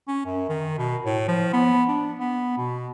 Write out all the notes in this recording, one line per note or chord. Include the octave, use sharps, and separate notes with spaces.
C#4
F#2
D#3
B2
A2
F3
B3
D4
B3
B2